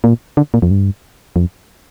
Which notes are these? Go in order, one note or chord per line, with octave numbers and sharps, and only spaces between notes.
A#2
D3
A#2
F2
G2
F2